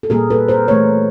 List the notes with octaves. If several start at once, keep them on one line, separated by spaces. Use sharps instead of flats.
A4
A#2 G3 A#3 G#4 A#4
A4 B4
A#4 C5
E3 A3 B4 C#5